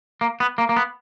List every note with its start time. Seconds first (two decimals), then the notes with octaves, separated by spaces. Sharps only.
0.21 A#3
0.40 B3
0.58 A#3
0.69 A#3
0.76 B3